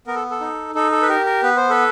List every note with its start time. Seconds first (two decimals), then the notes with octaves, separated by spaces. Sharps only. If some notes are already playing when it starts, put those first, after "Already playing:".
0.07 B3 A#4
0.15 A4
0.31 A4
0.41 D#4
0.75 D#4 A4
0.92 A4
1.02 B4
1.09 G4 A#4
1.26 A#4
1.43 B3 B4
1.57 C5
1.69 A4 B4